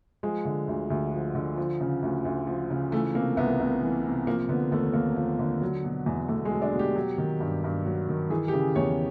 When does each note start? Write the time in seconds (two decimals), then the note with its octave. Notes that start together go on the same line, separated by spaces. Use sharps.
0.23 F3 G#3
0.45 D3
0.68 D2
0.90 D2
1.13 F3
1.35 D3
1.57 F3
1.81 C#3
2.02 D2
2.25 D2
2.47 F3
2.70 C#3
2.92 E3 A3
3.14 C3 A#3
3.37 C2 B3
3.60 C2
3.82 E3
4.05 C3
4.27 F3 A#3
4.49 D3 B3
4.72 D#2 A3
4.94 D#2 A#3
5.16 F3
5.39 D3
5.62 F#3
5.84 B2
6.06 E2
6.28 E2 A3
6.45 G#3
6.51 F#3
6.62 D4
6.73 B2
6.79 G4
6.95 F#3
7.18 D#3
7.40 G2
7.64 G2
7.86 F#3
8.09 D#3
8.30 E3 G#4
8.48 G4
8.53 C#3 G#4
8.75 E2 C#5